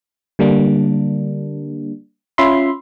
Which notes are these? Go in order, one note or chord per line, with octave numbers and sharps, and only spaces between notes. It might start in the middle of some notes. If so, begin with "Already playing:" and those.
D3 G3 A#3 D4
C#4 F4 E5 B5 C6